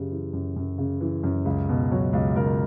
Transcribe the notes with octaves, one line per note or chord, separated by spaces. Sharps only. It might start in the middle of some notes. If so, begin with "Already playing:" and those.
Already playing: F#2 C#3 G4
E3
F#2
F#2
C#3
E3
F#2
C#2
B2
F#3
C#2
C#2 A#4